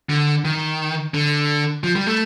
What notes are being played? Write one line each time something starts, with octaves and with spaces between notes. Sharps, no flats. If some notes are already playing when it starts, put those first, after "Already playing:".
D3
D#3
D3
F3
G3
A3